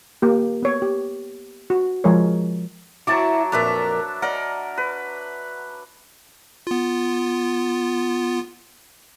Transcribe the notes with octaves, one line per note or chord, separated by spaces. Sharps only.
A#3 G4
B3 C#5
G4
F#4
F3 G#3 G#4 A#4 C#5
F#3 E4 F#4 A5 D6
F2 A#2 D4 A#4 B4 E5
A#4 D5 D#5 F#5
B4
B3 F4